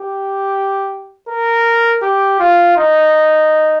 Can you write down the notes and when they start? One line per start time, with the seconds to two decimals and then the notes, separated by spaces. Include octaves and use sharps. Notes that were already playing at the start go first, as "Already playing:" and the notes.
Already playing: G4
1.28 A#4
2.02 G4
2.39 F4
2.77 D#4